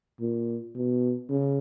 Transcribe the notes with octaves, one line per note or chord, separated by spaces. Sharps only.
A#2
B2
C#3